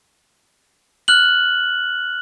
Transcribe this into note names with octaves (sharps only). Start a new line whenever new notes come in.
F6 F#6 F#7